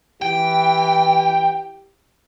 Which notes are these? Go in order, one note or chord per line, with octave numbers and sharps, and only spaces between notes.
E3 G4 G5